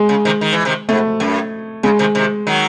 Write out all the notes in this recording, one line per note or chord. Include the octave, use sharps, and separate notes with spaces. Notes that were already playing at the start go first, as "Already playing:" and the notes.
Already playing: G#3
C#3
C3 D#3
D#3
E3
C3 D#3
G#2 A3
F#2
C#3 G#3
C3 D#3
C3 D#3
D#3 F#3